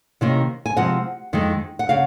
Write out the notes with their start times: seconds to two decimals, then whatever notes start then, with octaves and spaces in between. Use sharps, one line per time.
0.21 C3 D#3 A#3 C#4
0.66 G#5
0.76 C3 F3 G#3 C4 F#5
1.33 F2 D#3 G#3
1.79 F#5
1.89 C#3 F5